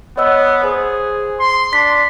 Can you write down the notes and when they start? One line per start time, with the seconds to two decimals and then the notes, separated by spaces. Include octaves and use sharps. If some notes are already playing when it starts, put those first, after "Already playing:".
0.17 B3 C#5 D#5 E6
0.64 G#4 C5
1.40 C6
1.73 D4 B6